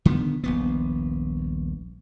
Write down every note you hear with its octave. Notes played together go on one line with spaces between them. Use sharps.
D3 D#3 B3
D#1 A#1 B3